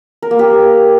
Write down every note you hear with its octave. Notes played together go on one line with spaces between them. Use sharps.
A#4
A#3
G4